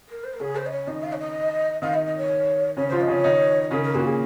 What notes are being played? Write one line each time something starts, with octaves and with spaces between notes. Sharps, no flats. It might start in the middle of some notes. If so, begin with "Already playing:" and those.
A#4
C5
A#4
C#3 C#4 G#4
C5
D#5
C#5
D#3 D#4 D#5
F5
C#5
D#5
D#3 D#4 F5
D#5
D#5
C#5
C#3 C#4 C#5
F3 F4 C5
D#5
C#3 C#4 C#5
D#3 D#4
C#3 C#4 A#4
A#4
A#2 A#3 F#4
G#4